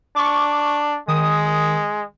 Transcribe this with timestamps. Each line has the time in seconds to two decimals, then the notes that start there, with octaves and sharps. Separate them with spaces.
0.16 D4 C#6 D6
1.08 D#3 G#3 D#6